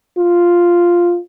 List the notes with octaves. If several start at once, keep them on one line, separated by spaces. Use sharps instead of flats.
F4